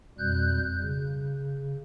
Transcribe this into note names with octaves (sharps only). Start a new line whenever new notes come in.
F2 B2 G3 F#6 G6
C#3